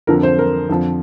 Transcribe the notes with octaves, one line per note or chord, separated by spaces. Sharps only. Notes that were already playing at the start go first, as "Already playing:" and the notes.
F2 D3 F3 A#4
C5
A#4
F2 D3 F3